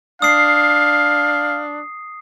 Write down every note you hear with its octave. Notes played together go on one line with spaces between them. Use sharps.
D4 F5 D#6 C7